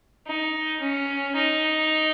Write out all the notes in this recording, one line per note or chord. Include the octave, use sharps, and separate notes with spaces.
D#4
C#4
D#4